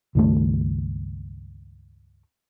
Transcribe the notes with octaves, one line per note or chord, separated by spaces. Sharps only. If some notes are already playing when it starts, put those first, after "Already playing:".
C#2 G2 D#3 A3